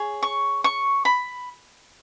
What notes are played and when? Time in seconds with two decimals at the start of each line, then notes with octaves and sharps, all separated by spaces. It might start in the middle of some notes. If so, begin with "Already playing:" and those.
Already playing: G#4 C#5
0.22 C#6
0.64 C#6
1.05 B5